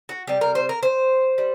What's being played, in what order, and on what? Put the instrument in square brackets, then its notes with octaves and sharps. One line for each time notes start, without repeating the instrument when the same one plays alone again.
[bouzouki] F#4
C3 G3 G4
A#4
C5
A#4
C5
G3